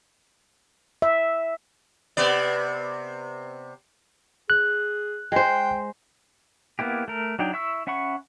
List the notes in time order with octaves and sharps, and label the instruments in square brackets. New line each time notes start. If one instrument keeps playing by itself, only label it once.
[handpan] E5
[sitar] C3 B3 D5
[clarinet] G#4 [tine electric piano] F#6
[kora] G#3 C5 [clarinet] G5
[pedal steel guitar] A#3 B3 E4 G4
A3 A#4
F#3 D4 D#4 G5
E4 E5 C#6 E6
C#4 E5 F#5 B5 C#6